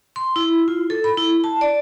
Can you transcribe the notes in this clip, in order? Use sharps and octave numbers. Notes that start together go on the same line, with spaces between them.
C6
E4
F4
A4
B5
E4
A5
D5